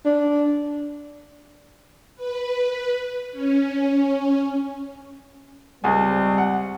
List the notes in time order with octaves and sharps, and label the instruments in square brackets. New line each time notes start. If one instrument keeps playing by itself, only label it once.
[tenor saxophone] D4
[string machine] B4
C#4
[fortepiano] C#2 G#3 G#5 [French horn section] G3 C4
[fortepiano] F#5